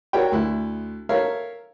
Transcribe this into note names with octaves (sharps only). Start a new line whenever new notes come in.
F#4 G4 A#4 C#5 D5 G5
D2 E4
A4 A#4 C#5 E5 F5